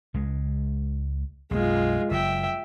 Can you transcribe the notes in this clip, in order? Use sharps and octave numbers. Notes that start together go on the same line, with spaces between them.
C#2 G#3
B1 F#2 G#3 F4
F#1 F#3 E5 G5